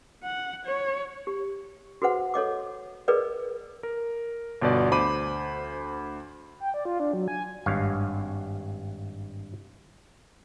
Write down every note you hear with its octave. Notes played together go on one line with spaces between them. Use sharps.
F#5
C#5
G4
F#4 G#4 B4 C5 F#5
A4 C#5 D#5 D6
G#4 A#4 B4 D5 D#5
A#4
G1 B2 D5
D2 C5 B5 D6 D#7
G5
D5
F4
D4
F#3
G#5
G#1 G2 C#5 F5